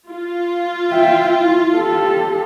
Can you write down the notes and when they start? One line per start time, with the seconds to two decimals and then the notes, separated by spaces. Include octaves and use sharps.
0.10 F4
0.91 E5 G5
1.42 E4
1.75 G4 A4